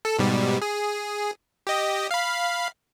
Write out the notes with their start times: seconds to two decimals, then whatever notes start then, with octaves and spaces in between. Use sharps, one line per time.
0.05 A4
0.19 G#2 B2 G3
0.62 G#4
1.67 G4 D#5
2.11 F5 B5